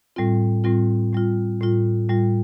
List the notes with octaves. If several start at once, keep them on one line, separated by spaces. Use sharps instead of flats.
A2 G3 C4 F4
A2 G3 C4 F4
A2 G3 F4
A2 G3 F4
A2 G3 F4